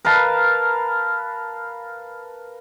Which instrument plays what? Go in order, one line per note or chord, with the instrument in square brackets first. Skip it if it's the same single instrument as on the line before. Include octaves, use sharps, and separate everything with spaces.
[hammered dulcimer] A#4 B4 F5 A5